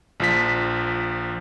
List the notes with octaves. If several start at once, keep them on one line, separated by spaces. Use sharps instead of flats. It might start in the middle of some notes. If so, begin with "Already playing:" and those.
A#1 F3 B6